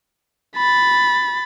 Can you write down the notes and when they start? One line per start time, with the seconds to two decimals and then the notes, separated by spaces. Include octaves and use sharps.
0.57 B5 A6